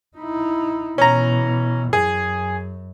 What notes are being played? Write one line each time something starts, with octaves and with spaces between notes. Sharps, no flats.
D#4 E4
B2 E3 C#4 A#5
F#2 G#4